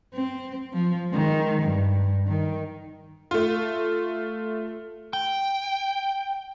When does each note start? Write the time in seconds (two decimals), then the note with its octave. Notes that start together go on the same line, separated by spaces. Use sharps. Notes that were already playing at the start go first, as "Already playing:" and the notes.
0.13 C4
0.73 F3
1.10 D#3 G#3
1.63 G2
2.28 D#3
3.31 A3 F4
5.13 G5